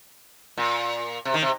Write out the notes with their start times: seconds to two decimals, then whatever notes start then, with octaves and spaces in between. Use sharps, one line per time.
0.58 A#2
1.25 C3
1.34 D#3
1.43 C3